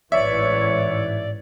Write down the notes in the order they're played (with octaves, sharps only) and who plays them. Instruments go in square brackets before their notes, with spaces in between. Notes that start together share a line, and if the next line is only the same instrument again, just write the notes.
[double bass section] A1 G#2 E3 [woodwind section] C#5 [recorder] D5 [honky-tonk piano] E5